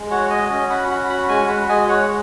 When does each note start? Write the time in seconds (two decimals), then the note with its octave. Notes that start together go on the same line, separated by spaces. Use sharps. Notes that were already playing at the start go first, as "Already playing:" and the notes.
Already playing: G#3
0.11 F#4 C#5 F#5
0.30 D#5 G#5
0.50 C#4 D#5 G#5
0.70 F#5 B5
0.89 F#4 F#5 B5
1.09 F#5 B5
1.29 G#3 G#5 C#6
1.48 F#5 B5
1.69 G#3 D#5 G#5
1.88 C#5 F#5